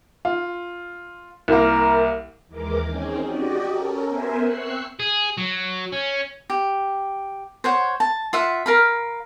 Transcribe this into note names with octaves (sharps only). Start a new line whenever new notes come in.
F4
C2 A#3 A#4
D#2 E3 G#3 A#4 D6
C4 C#4 D#4 G#4
F#4 G4 D5 D#5
C#4 A4 A#4
B3 A#4 C5 E5 G#5
C4 C#6 E6 F#6 C7
G#4
F#3
C#4
G4
C5 C#5 F#5
A5
F4 E5 F#5
A#4 F5 B5